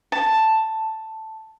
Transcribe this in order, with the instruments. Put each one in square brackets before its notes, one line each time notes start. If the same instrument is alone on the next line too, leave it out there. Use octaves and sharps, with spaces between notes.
[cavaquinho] A5